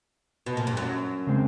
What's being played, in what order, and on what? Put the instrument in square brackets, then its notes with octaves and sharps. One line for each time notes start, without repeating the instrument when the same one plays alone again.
[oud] B2
A#2
G2
F#2
[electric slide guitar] C#3 G#3 C4